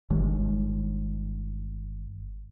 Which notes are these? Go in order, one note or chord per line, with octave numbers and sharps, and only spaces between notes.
G1 D#3 G#3